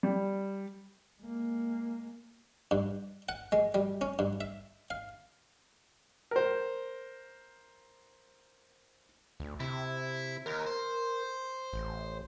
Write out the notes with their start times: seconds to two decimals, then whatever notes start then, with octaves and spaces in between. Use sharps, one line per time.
0.03 G3
1.21 G#3 A#3
2.71 G2
3.29 F#5
3.52 G#3
3.74 G3
4.01 C#4
4.19 G2
4.41 E5
4.90 F5
6.31 A#4 C5
9.40 D2
9.60 C3 E4
10.46 D#2 A#4
10.66 C5
11.73 A1